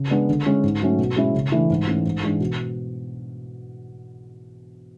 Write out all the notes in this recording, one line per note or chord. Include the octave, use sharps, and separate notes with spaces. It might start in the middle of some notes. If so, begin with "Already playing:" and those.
Already playing: C#3
G#3 B3 D4
D3
G#3 C#4 E4
G#2
F#3 A3 C#4
B2
G#3 C#4 E4
C#3
E3 A3 D4
G#2
E3 A3 C#4
G#2
E3 G#3 D4
B2